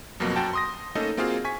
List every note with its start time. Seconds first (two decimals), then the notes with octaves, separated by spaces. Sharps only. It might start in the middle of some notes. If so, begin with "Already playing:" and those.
0.20 F2 B2 F#3 A#3
0.36 F#2 F#4 G5 A5
0.53 C6 D#6 A#6
0.95 A3 A#3 C#4 D#4 A4 D#5
1.17 A#3 C4 F4 F#4 G#4 F5
1.45 G#5 C#6 B6